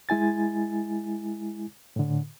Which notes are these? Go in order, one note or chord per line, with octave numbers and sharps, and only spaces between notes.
G#3 E4 G#5 A6
A2 D3